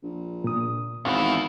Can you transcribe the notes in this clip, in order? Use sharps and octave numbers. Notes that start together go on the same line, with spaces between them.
A#1
A#2 D#6
G#1 E2 E4 F5 F#5